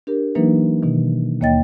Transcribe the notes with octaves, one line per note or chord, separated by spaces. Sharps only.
D4 G4 A#4
E3 F#3 A#3 D4 D#4 B4
B2 D#3
D#2 A#3 C#5 D#5 G5 A6